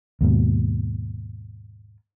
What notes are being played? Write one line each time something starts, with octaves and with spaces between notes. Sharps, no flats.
D#2 G#2 B2